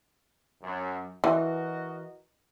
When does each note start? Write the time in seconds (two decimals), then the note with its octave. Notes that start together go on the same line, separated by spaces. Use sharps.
0.61 F#2
1.24 E3 F#4 A#4 D#5